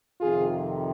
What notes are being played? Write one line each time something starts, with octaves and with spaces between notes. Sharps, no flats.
F2 C3 D#3 F4 G#4